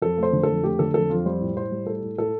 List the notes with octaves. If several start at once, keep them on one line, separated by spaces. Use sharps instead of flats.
F2 A4
A3 C5
D3
A4
F2
A3 G4
D3 A4
F2 A4
F2 F4
G3 C5
A2
A2 C5
G3
A2 A4
A2
A2 A4